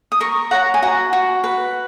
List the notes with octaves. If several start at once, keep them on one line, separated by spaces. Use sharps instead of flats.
D#6
A#4 A#5 C#6
C#5 F#5 A#5
G#5
F#4 F#5 A#5
F#4
B4